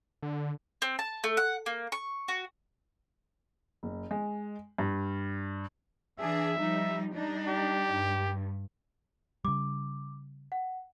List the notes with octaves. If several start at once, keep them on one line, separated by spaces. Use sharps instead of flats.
D3
C4
A5
A3
F#5
A#3
C#6
F#4
F#1
G#3
G2
E3 D4 G#4 E5
F3 G3 D#4
G3 D4 D#4
G4
G2
C#3 G3 D6
F#5